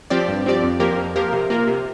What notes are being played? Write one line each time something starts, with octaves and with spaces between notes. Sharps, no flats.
F3 C4 G4 D5
G2
F3 C4 G4 D5
F2
F3 A#3 G4 A#4
F2
F3 A#3 G4 A#4
C3
A#3 F4 A#4
C3